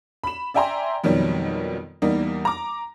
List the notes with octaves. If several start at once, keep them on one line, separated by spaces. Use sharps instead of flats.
B5 E7
D5 E5 G5 G#5 A#5 C6
F2 B2 D#3 F#3 G3
E2 G3 A#3 D#4
A#5 D6